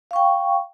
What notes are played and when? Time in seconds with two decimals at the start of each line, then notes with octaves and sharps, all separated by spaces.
0.11 F5
0.13 C#6
0.16 G5